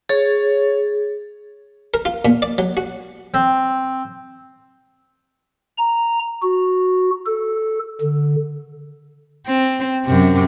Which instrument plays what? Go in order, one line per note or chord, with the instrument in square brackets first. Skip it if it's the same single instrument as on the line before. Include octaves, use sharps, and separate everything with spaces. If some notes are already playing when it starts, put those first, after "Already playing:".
[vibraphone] G#4 [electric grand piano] C#5 A6
[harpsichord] A#4
F4
A#2
D5
F#3
F#4
C4
[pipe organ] A#5
F#4
A4
D3
[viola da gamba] C4
F#2 C3